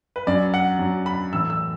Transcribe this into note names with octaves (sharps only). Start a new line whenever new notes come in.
B4
F#2 F#3 D5
F#5
F#2 F#3
B5
A2 E3 E6
E6